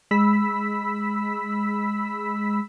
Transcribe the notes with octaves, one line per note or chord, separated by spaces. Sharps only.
G#3 B5 E6 B6